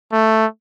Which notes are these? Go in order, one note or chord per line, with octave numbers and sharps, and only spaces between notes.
A3